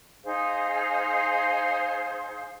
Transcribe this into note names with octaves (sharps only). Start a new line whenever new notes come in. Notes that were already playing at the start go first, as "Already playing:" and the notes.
D#4 G#4 C5 F5